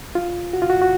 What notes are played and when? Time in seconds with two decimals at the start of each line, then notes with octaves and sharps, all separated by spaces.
0.15 F4
0.53 F#4
0.62 F4
0.70 F#4
0.81 F#4